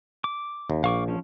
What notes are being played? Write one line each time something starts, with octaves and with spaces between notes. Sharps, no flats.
D6
D#2
A#1 F5 C#6 D6
F3 C#4